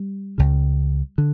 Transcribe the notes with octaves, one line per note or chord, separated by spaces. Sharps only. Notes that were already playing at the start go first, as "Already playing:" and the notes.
Already playing: G3
C#2 C#3
D3